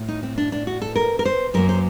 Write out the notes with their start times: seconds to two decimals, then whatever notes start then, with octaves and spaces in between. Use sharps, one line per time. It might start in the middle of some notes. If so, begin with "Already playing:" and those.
Already playing: A2
0.08 D#4
0.23 C4
0.38 D4
0.52 D4
0.67 F#4
0.82 A4
0.96 A#4
1.19 A#4
1.25 C5
1.54 F#2 F#3 A#3 A#4
1.69 C5